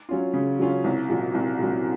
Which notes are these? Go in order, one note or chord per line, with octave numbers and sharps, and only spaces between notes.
F#3 C#4 F4
C#3
F#3 C#4 F4
C2
A#2 F#3
C2
A#2 F#3